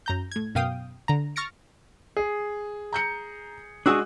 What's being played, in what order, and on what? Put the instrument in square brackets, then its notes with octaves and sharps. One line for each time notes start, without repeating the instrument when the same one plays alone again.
[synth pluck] F#2 A#5 G6
A2 G#6
F#2 B2 F5 G5 D#6
D3 A#5
C#6 F6 A6 A#6 C#7 D7
[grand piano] G#4
[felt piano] A#5 G6 C#7
[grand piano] G#3 [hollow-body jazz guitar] D4 F#4 G#4 [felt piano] D#6 E6 F#6